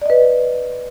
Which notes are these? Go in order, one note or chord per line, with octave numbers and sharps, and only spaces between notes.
B4 D5 D#5